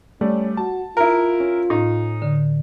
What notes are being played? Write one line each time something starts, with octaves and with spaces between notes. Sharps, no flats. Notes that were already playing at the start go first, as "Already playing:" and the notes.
G3 A3 C#4 D5
F#4 A5
E4 F4 A#4
C#4
A2 D#4
D3